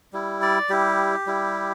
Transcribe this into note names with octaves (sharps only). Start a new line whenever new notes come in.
G3 E4
D5
G3 E4 G4
G3 E4